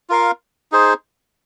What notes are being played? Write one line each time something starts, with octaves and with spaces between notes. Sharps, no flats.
F4 A#4 F5
D#4 G#4 C5